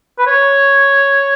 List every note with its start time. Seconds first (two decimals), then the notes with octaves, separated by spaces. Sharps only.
0.19 B4
0.27 C#5